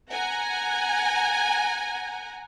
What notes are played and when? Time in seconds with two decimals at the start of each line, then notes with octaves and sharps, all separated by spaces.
0.13 F#5 G#5 A#5